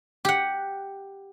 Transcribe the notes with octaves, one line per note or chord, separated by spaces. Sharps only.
G4 F#5